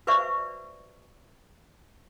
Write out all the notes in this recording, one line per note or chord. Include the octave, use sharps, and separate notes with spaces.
F#4 B4 C5 D5 E5 C#6